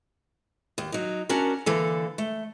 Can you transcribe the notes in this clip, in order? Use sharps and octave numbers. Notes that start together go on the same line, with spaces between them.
D#2
F#3 D#4
C#4 D4 F#4 A#4
D3 E3 A#3 A4
A3